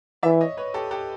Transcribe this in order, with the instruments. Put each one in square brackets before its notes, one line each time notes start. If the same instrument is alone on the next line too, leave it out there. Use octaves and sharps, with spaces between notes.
[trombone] E3 [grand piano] D5 E5
[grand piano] C#5 D#5
B4 C#5
G4 A4
G4 A4